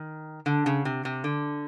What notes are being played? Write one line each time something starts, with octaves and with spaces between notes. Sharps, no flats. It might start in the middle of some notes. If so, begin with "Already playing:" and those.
Already playing: D#3
D3
C#3
C3
C3
D3